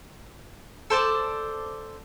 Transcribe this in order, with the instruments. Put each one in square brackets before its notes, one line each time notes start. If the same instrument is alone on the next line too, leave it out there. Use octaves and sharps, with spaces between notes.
[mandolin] A4 C5 D5 A5